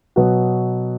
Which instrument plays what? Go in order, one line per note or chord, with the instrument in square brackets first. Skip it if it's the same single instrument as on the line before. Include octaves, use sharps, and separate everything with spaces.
[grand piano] B2 F#3 B3 F#4